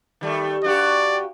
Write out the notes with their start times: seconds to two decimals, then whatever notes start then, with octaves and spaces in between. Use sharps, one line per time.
0.21 D#3 G3 A3
0.64 G2 F#4 G4 D5